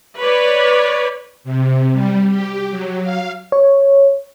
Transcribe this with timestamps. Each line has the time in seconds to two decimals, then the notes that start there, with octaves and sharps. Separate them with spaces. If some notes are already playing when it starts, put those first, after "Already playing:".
0.18 B4 C#5 D5
1.44 C3
1.93 G3
2.30 G4
2.70 F#3
3.03 F5
3.52 C#5